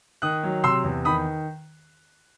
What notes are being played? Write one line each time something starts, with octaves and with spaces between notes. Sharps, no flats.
D#3 D#6 F#6
F#3
C3 C6 E6
E2
D#3 B5 D#6